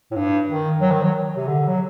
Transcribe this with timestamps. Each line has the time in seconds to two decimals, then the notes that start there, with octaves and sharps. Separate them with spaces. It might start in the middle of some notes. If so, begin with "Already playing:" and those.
0.11 A2
0.16 G2
0.48 D#3
0.81 F#3
0.92 D#3
1.03 F#3
1.37 C3
1.47 D3
1.68 F#3